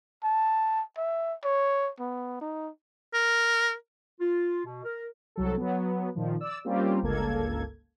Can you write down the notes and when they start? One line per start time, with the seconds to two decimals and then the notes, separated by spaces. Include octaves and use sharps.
0.24 A5
0.97 E5
1.45 C#5
1.99 B3
2.41 D#4
3.14 A#4
4.20 F4
4.65 B2
4.84 A#4
5.36 C2 F#3 A4
5.58 F#3 B3
6.15 A#2 D#3 F3
6.40 D5 E6
6.65 G3 A#3 C4 C#4 F4 G4
7.02 G1 C#2 A#3 A4 G#6